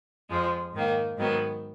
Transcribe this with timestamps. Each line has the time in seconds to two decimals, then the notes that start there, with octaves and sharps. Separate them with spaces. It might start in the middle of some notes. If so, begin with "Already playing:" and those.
0.29 F2 F3 G#3
0.73 G#2 D#3 A#3
1.17 G#2 D#3 F#3 B3